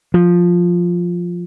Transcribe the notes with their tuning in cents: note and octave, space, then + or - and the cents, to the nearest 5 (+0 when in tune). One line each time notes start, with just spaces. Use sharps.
F3 +5